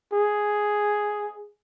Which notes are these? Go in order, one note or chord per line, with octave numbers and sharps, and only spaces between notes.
G#4